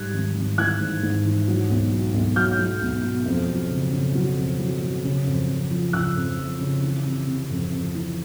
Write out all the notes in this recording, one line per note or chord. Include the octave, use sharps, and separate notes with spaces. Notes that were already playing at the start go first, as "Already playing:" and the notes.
Already playing: G#2 G3 F#6 G#6
G#1
G#1
E3 F#6 G#6
G#2
G#2
E3
F#3
B1
F#3
B1
F#3 F6 G6
F#3
B1
B2
F2
F#3
C#3
C#3
F#3
F2
F#3
F#3
C#3
F2
F2
F3
C#3 E6 F#6
F2
F3
C#3
E3
C3
C3
F2
F2
E3